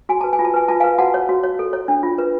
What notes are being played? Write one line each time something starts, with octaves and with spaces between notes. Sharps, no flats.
F#4 G#5
B4 A5
G#5
F4
A5
B4 G#5
F4 A5
B4 F5 G#5
F#4 F#5 A5
C#5
F#4
C#5
A4
C#5
D4
F4
B4